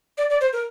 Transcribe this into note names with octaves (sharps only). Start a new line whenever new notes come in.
D5
D5
C5
A#4